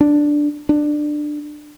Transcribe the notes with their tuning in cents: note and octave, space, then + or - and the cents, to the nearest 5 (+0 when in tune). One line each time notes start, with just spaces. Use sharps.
D4 +0
D4 +20